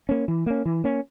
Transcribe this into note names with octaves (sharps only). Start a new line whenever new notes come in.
A#3 C#4
E3
A#3 C#4
E3
A#3 C#4